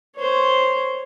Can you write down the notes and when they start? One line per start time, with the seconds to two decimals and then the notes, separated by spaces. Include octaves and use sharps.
0.15 C5 C#5